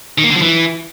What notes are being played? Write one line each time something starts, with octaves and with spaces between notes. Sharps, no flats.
D#3
A#3
D3
F3
E3